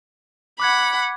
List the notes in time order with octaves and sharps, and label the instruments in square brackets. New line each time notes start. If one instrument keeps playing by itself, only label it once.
[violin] F#5 B5 [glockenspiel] D6 F#6 G#6